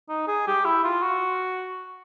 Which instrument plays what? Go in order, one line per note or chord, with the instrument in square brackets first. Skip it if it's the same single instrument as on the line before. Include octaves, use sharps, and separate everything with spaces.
[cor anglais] D#4
G#4
G4
E4
F4
F#4